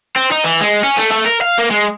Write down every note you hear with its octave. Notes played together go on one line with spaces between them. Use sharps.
C4
D#4
E3
G#3
C#4
A3
A3
A#4
F5
A#3
G#3